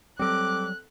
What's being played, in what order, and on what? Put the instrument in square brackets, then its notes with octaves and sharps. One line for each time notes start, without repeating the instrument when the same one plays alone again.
[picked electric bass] F#3 G3 [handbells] C4 A4 [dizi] D6 [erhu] F#6